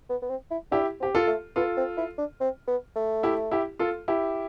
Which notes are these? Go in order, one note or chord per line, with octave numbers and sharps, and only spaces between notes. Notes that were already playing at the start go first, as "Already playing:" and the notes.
B3
B3
C4
E4
D4 E4 G4
C4 G4
F4 A4
A3
B3 F4 A4
C4
E4
D4
C4
B3
A3
E4 G4
E4 G4
F4 A4
E4 G4